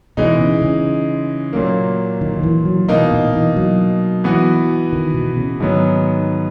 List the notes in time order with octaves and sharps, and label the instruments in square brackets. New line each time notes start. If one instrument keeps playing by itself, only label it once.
[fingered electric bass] B2 [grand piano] E3 G#3 D#4
[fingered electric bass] C#3
C#3
[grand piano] A#2 F#3 A#3
[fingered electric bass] D#3
D#3
E3
F#3
[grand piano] B2 A#3 D#4 [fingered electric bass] E3
[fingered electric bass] A#2
E3
F#3
[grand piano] E3 B3 F#4
[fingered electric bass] D#3
B2
C#3
[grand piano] G#2 F#3 B3 [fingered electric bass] D#3